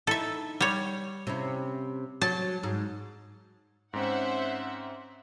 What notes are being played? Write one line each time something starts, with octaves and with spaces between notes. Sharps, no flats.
D#4 E4 A4 E5
G3 C#5
C3 C#4 E4
F#3 A5
G#2
G#2 C4 C#4 C5 E5 F#5